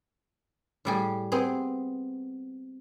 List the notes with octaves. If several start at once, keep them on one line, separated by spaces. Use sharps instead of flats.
A2 G3 G#4
B3 C4 G#4